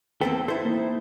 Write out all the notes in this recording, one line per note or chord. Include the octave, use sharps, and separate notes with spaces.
E2 A#3 C4 A4 B4 G5
E4 A4 C5
A#3 D#4